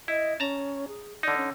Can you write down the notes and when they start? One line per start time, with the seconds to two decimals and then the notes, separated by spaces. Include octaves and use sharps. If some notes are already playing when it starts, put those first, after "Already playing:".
0.08 E4 D#5
0.40 C#4 A5 A#5
0.88 G#4
1.23 D3 D#4 D5
1.37 C#4